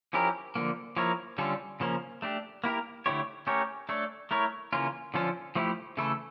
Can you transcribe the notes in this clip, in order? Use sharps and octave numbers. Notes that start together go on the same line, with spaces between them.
F3 C#4 E4 G4 A#4
D3 F3 A#3
F3 A#3 E4 A#4 C#5
D3 G3 C#4 F4 A4
C#3 F3 A#3 C#4
A3 D4 G4
A#3 E4 G4 A#4
D3 A3 E4 G4 C#5
A3 C#4 G4 A#4 C#5
A3 D4 A4 C#5
A3 E4 A#4 C#5
C#3 E3 A#3 C#4 F4
D3 F3 C#4 F4 A4
F3 A3 E4 G4
C#3 E3 A3 E4 A4